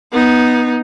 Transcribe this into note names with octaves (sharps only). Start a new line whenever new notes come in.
B3 D#4